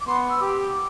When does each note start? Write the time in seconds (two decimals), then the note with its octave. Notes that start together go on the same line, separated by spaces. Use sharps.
0.01 D6
0.07 B3 C6
0.30 E6
0.41 G4 D6